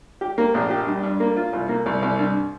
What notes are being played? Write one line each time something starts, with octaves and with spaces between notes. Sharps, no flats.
G4
A#3
A#1
G4
G2
G2
A#3
F4
C2
A#3
C2
C2
G2